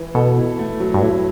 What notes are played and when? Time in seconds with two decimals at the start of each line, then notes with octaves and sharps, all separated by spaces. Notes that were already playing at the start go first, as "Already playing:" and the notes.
Already playing: E3
0.15 B2 A4
0.36 E4
0.59 A3
0.80 F#3
0.94 G2
1.02 A2 E4